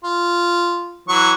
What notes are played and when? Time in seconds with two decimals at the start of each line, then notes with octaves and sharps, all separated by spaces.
0.04 F4
1.08 E3 F#3 C#6